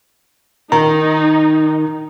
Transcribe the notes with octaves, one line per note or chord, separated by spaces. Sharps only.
D#3 D#4 A#5